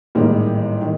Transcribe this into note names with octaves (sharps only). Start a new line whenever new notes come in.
A1 G#2 D#3 G3 A#3
D#3